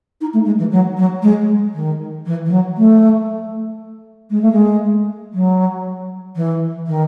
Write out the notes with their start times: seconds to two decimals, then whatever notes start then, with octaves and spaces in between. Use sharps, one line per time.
0.21 D#4
0.33 A3
0.45 G#3
0.59 E3
0.71 F#3
0.97 F#3
1.22 G#3
1.74 D#3
2.26 E3
2.45 E3
2.51 F#3
2.77 A3
4.30 G#3
4.42 A3
4.52 G#3
5.33 F#3
6.36 E3
6.87 D#3